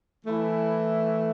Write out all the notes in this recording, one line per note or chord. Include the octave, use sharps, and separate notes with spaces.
E3 A3 E4